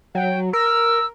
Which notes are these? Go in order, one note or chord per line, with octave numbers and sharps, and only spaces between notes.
F#3 G5
A#4 E6